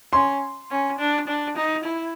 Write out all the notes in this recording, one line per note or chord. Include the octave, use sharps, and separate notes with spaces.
C#4 C6
C#4
D4
D4
D#4
E4